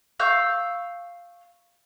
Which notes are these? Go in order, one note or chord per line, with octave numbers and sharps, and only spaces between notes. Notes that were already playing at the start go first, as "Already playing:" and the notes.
F5 C#6 E6 G6